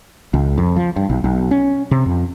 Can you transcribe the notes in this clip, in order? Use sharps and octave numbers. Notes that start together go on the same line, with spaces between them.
C#2
F2
F3
G2
B1
B1
C#4
C3
F2